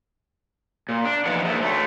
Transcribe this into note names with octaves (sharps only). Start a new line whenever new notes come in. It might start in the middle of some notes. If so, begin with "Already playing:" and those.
A#2
D4
E3 F3 D#4 B4 F#5
A3 A#3 G#4 C5 D5 E5
D3 F#3 A3